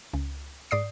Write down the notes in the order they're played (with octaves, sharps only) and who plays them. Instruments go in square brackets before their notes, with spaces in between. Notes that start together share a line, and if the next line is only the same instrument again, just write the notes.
[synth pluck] C#2
G#2 D5 D#6 C7